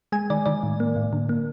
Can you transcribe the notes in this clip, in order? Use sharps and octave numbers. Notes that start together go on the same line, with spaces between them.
G#3 G#5
D#3 D5
D#3 D5
A2
A#3
A2
D3
A#3